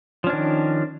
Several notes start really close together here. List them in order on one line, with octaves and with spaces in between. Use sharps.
F3 C#4 D4 D#3